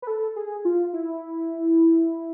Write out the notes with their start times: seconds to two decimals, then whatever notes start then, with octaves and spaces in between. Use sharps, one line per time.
0.02 B4
0.07 A4
0.36 G#4
0.65 F4
0.93 E4